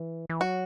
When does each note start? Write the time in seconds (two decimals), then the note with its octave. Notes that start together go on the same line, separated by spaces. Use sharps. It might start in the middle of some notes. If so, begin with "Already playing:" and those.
Already playing: E3
0.30 E3
0.41 F#3 F#4